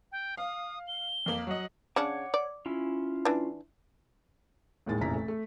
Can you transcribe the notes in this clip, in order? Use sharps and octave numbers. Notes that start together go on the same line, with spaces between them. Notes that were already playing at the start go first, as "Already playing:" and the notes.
G5
F5 D#6
G7
F2 A#3 F#7
F#3 D#5 F#5
C#3 D4 C#5 F#5 D6
D5
C#4 E4 F4
E3 D4
A1 D#2 A2 G#3 A6
F1 A#1 C#3 E3 A#5 B6
A3
A3